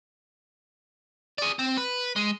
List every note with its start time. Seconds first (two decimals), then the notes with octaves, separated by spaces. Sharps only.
1.38 G#4 D5
1.59 C4
1.77 B4
2.16 G#3